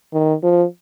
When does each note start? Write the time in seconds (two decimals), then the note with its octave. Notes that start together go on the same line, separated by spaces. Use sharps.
0.13 D#3
0.43 F3